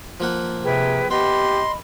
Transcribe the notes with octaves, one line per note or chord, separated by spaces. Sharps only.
F3 A#3 F#5
C3 G#4 B4 G5
B3 G4 D#5 B5 C6